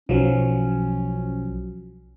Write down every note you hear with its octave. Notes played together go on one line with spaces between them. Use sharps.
B1 F3 F#3 C#4